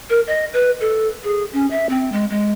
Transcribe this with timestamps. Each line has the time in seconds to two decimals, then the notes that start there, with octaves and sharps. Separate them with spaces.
0.10 A#4
0.27 D#5
0.53 B4
0.81 A4
1.24 G#4
1.53 C#4
1.70 E5
1.89 C4
2.12 G#3
2.30 G#3